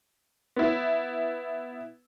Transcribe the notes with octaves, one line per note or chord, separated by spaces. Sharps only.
B3 E4